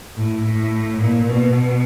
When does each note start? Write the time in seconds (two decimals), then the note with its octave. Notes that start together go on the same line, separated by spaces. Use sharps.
0.17 A2
0.45 A2
1.01 A#2
1.29 B2